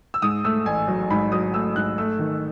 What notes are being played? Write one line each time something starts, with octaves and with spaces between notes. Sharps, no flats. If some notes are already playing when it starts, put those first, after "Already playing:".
E6
G#2 D#6
A3 E6
A1 G#5
F#3
G#2 B5
F#3 D#6
A3 E6
G#2 F#6
A3 E6
D#3